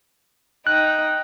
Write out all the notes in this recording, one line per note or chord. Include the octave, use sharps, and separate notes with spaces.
D#4 G5 F#6